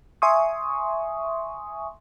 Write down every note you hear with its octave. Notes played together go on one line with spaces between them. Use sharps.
E5 G#5 C6 C#6 D#6